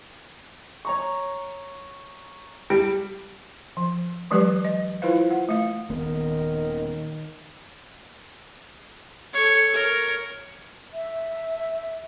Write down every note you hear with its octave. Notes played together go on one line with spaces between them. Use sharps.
C#5 A#5 C#6
G3 D7
F3
E3 F#3 G#3 G4 B4 D5
D#5
E4 F4 B4 C5 F5
F#5
A3 F5
D#1 D#3 A#3 B3 A#4
A4 C#5
A#4 C#5
E5